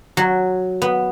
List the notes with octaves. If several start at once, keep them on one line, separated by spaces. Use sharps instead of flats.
F#3
B3